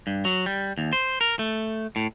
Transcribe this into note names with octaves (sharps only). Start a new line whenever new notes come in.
G2
F#3
G3
D#2
C5
A#4
A3
A2